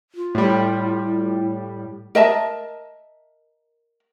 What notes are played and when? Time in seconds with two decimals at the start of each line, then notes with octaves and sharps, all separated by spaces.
0.16 F4
0.35 A2 G3 E4
2.15 A#4 D#5 E5 A5